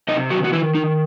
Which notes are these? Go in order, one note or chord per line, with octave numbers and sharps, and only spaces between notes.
C3 D#4 D#5
D#3 F#3 F#4
F#4
D#3 E3 E4
D#3 D#4